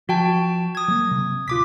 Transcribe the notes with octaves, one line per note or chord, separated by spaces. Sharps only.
F3 F#4 G5 A5
D#6 G#6
F#3 A#3
C3
D1 F4 D6 B6